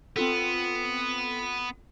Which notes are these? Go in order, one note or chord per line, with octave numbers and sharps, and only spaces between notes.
B3 C4 F4 A4